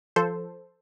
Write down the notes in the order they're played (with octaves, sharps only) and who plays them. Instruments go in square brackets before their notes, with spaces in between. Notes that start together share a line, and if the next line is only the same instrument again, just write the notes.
[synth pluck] F3 A4 C5